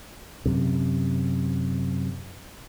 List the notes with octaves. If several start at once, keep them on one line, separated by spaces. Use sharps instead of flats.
F#2 C3